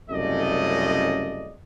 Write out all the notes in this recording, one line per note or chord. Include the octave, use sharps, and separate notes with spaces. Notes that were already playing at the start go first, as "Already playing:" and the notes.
C2 F#2 C#3 A3 D5 D#5